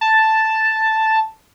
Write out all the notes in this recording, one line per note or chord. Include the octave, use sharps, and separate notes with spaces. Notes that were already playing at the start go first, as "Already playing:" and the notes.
A5